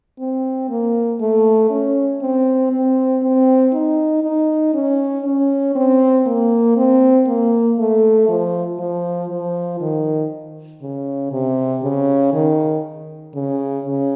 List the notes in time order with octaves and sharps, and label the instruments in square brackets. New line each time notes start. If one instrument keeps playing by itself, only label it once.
[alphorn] C4
A#3
A3
C#4
C4
C4
C4
D#4
D#4
C#4
C#4
C4
A#3
C4
A#3
A3
F3
F3
F3
D#3
C#3
C3
C#3
D#3
C#3
C#3